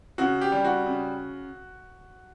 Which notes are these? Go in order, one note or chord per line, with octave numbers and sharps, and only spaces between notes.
C#3 F#4
G4
G3
F#4
C#3